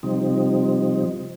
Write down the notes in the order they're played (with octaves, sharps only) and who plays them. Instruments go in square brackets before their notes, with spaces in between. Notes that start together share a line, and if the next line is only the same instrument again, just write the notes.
[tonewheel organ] C3 F3 G3 C4 D#4